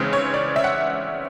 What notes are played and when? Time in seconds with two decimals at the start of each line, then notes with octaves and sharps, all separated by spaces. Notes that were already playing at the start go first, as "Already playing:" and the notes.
Already playing: C#3 E3 G#3 C4 D#4
0.13 C#5
0.34 D5
0.56 E5
0.64 F#5